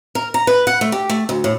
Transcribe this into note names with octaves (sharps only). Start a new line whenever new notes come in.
A#4
A#5
B4
F#5
A3
G4
A3
D2
A2